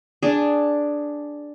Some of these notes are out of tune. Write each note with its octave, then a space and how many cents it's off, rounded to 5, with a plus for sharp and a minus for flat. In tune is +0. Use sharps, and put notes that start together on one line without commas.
D4 +0 G#4 -5